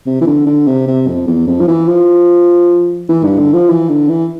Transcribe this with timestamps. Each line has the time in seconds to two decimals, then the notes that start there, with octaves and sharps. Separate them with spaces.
0.06 C3
0.21 E3
0.27 D3
0.46 D3
0.67 C3
0.87 C3
1.07 F2
1.27 E2
1.47 F2
1.61 F3
1.68 E3
1.88 F3
3.09 E3
3.24 G2
3.39 D3
3.53 F3
3.69 E3
3.89 D3
4.09 E3